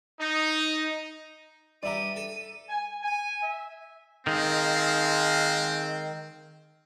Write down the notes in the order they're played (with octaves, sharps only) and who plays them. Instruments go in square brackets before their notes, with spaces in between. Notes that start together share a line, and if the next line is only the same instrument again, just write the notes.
[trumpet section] D#4
[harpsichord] G2 D4 G4 [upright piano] D5 E5 A#5 [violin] D#7
[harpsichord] A4
[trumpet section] G#5
G#5
E5
[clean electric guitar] D#3 [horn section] G#3 F5 [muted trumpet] C4